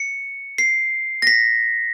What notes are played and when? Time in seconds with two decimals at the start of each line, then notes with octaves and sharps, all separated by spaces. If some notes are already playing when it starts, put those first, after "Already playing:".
Already playing: C#7
0.58 C7
1.22 A#6
1.27 B6